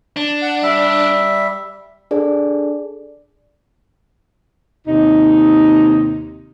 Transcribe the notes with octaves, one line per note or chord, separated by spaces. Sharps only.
D4
F#5
G3 E5
D4 G#4 A4 D5
D#2 C3 D#4